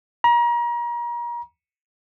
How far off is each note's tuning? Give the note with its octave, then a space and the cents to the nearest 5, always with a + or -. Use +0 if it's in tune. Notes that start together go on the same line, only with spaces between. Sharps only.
A#5 +35